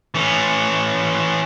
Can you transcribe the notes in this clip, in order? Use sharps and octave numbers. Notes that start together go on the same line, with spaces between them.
E3 C#4